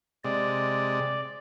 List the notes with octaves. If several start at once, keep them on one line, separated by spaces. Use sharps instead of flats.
C3 G#3 D5